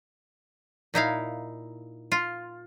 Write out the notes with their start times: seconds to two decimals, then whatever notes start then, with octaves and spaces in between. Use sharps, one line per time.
0.94 A#2 D#4 E4 F5
2.12 F4